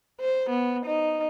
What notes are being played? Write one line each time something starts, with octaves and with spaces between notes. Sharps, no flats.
C5
B3
D#4